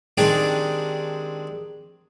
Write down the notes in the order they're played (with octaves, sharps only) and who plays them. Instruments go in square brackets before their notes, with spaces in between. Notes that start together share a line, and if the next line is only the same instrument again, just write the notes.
[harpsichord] D#3 G#3 C4 D4 D#4 G4